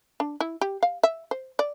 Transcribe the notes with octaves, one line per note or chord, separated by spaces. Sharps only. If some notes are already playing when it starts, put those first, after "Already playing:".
D4
E4
G4
F5
E5
C5
D5